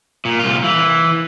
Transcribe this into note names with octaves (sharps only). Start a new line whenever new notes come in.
A#2
C2 F4
E3